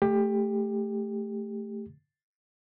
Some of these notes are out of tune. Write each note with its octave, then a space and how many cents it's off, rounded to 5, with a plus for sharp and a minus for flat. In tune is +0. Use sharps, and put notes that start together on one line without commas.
A3 +0 G4 +20